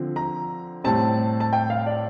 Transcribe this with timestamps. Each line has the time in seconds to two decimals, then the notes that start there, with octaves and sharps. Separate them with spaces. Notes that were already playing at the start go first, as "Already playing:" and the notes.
Already playing: D3 F3 C4
0.16 A#5
0.84 A2 G3 C4 A5
1.40 A5
1.53 G5
1.70 F5
1.86 D5